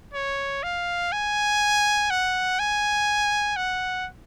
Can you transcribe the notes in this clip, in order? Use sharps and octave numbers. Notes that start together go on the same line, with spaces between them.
C#5
F5
G#5
F#5
G#5
F#5